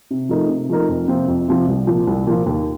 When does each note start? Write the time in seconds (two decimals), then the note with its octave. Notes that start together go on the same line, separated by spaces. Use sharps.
0.11 C3
0.29 F3 A3 D#4 A#4
0.49 C3
0.69 F3 A3 D#4 A#4
0.89 F2
1.08 C3 F3 C4 F4
1.28 F2
1.48 C3 F3 C4 F4
1.68 C2
1.87 A#2 F3 A#3 F4
2.07 C2
2.26 A#2 F3 A#3 F4
2.46 D#2